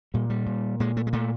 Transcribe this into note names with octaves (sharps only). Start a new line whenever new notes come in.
A#2 G3
G3
A#2
A#2 G#3
A3
G#3
A#2 A3